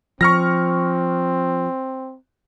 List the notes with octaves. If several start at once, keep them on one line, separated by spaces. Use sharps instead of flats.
F3 C4 C#6 F6 A#6